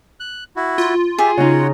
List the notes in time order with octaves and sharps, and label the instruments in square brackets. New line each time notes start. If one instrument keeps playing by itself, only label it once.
[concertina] F#6
E4 F#4
[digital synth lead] F4
[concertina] G4 E5 [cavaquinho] G#4
[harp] C#3 D#4 [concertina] F#4 C#5 F#5